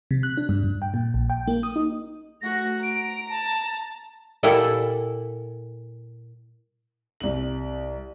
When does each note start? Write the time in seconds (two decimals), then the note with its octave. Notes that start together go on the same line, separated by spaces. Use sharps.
0.11 C3
0.23 F#6
0.37 D4
0.49 G2
0.64 G2
0.82 G5
0.94 A#2
1.14 A#1
1.30 G5
1.47 A#3
1.63 D#6
1.76 D#4
2.42 A3 F#4 A#6
2.83 A#5 D7
3.29 A5
4.43 A#2 G3 E4 A4 F#5 A5
7.20 C2 F#7